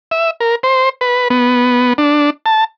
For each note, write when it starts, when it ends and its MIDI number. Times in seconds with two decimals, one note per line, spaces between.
0.11 0.31 76
0.40 0.55 70
0.63 0.89 72
1.01 1.28 71
1.30 1.93 59
1.98 2.30 62
2.46 2.64 81